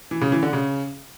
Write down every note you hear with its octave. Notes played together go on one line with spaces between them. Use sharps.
E3
C#3
E3
D3
C#3